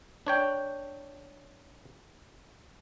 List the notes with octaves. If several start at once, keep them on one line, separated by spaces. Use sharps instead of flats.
D4 C#5 G5